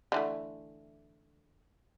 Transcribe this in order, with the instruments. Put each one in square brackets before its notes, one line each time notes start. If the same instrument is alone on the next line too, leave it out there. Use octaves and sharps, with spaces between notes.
[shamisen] D3 E3 A3